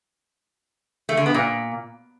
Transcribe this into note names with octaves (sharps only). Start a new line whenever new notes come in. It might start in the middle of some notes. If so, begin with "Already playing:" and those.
A3
D3
B3
A#2